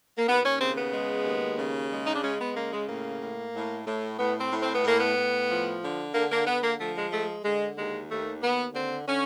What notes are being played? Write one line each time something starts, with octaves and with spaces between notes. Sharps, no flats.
A#3
D#2 B3
C#4
C#3 C4
B3
G#3
D#2
C#3
G#3
D#4
D4
G#3 C#4
B3
C#3 A#3
G#3
A2 A#3
A2
A2
A2
A2 B3
C4
A2
C4
B3
A2 A#3
B3
A2
F3
D3
D3 A#3
A#3
D3 B3
A#3
F3 A3
G#3
G#3 A3
D3 G#3
D#2 G#3
D#2 A3
D#2 B3
D3 C4
D3 C#4